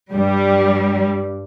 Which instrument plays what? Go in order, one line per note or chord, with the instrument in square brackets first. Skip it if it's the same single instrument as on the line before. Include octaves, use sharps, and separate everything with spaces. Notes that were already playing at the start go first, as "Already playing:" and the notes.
[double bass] G2 [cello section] G3